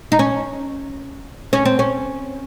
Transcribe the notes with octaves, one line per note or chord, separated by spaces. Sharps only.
D#4
C#4
C#4
C4
C#4